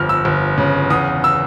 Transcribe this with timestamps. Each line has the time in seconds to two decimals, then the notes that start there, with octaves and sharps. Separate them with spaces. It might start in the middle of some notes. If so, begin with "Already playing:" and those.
Already playing: G1 F2 F6
0.09 E6
0.25 G1
0.58 C#3
0.90 E2 D#6
1.24 E6